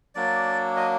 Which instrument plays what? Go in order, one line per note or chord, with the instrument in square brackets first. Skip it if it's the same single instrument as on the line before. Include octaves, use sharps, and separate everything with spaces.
[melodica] F#3 A#3 D4 D5
D#5